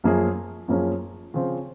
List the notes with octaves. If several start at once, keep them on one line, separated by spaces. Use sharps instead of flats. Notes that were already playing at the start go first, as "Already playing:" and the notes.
F#2 F3 A#3 C#4 G#4
F#2 F3 A#3 C#4 G#4
C#3 F3 C4 F4 C5